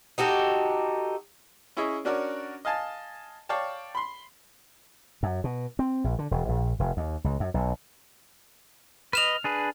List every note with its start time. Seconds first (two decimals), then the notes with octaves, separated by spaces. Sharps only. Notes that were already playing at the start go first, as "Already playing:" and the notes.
0.18 D#4 F#4 G4 A4
1.77 C#4 E4 G#4 C#5 D#5
2.05 C#4 D4 F#4 A#4 C#5 D5
2.65 D#5 F5 G#5 A5
3.49 C#5 D5 F5 G5 A5
3.95 B5 C6
5.23 F#2
5.44 B2
5.79 C4
6.04 A#1
6.19 D3
6.31 E1
6.49 A#1
6.79 F1
6.97 D#2
7.24 C#2
7.40 F#2
7.54 B1
9.13 B4 D#5 F6 E7 F7
9.44 D4 G#4 B4